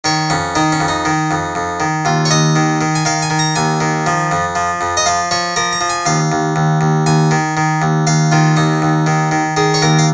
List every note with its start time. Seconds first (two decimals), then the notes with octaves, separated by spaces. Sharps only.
0.04 D#3 C#5
0.30 F2 C#4
0.55 D#3 D#4
0.72 C#4
0.80 F2
0.88 D#4
1.05 D#3
1.31 F2
1.55 F2
1.80 D#3
2.05 D#2 F4
2.25 C#5
2.31 D#2 D#5
2.56 D#3
2.81 D#3
2.95 G#5
3.05 D#3 F5
3.22 G#5
3.30 D#3
3.39 A#5
3.55 D#2 G#5
3.81 D#3
4.06 F3
4.31 F2
4.55 F3
4.81 F2
4.97 D#5
5.06 F3 F5
5.31 F3 C#5
5.56 F3 A#4
5.73 A#5
5.81 F3
5.89 G#5
6.06 D#2 F5
6.32 D#2
6.56 D#2
6.81 D#2
7.06 D#2 G#5
7.31 D#3
7.57 D#3
7.82 D#2
8.07 D#2 F5
8.32 D#3 F4
8.57 D#2 D#4
8.82 D#2
9.06 D#3
9.31 D#3
9.57 D#3 G#4
9.74 C#5
9.82 D#2 A#4
9.99 F5